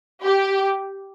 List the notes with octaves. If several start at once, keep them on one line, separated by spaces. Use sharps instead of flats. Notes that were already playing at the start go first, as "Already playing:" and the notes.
G4